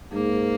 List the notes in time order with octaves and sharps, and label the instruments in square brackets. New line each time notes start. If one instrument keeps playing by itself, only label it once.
[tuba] G#2 [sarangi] A#3